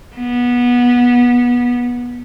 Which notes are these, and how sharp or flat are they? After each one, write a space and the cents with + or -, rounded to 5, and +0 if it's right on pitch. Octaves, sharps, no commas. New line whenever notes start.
B3 -20